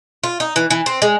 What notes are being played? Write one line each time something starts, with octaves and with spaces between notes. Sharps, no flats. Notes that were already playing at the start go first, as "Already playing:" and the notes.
F4
D#4
E3
E3
C4
G#3